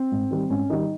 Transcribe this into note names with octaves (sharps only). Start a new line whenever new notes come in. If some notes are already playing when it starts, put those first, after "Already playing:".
Already playing: C4
G#2
D#3 G3
G#2 C#4
D#3 G3 D#4